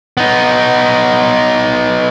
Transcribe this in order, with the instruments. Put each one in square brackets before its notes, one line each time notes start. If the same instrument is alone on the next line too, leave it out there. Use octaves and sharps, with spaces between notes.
[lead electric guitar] B3 D#4